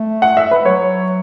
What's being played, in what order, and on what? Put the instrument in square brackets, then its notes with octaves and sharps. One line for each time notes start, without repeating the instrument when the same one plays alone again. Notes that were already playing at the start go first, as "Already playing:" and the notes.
Already playing: [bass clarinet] A3
[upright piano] F#5
E5
B4
[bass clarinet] F#3 [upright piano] C#5